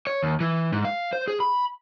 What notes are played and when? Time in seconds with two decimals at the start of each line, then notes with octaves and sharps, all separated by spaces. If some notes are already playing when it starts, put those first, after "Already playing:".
0.07 C#5
0.23 D#2
0.40 E3
0.72 G#2
0.85 F5
1.13 C5
1.28 G#4
1.40 B5